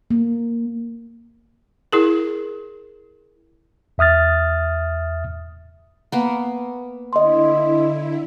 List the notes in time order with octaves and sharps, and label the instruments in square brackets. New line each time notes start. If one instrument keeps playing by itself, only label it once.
[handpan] A#3
[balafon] E4 G#4 A#4
[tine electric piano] E2 E5 D#6 F6 A6
[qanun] A#3 B3
[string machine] D3 E4 [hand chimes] D#5 C6